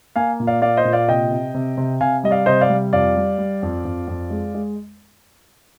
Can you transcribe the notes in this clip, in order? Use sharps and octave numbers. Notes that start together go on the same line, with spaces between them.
A#3 F5 G#5
A#2
D5 F5
A#3 D5 F5
C5 D#5
A#2
D5 F5
C3 D#5 G5
C3
C3
C3
C3 F5 G#5
G3 D#5
D5 F5
C3 C5 D#5
D5 F5
G3
F2 D5 F5
G3
G3
F2
F2
F2
G#3
G#3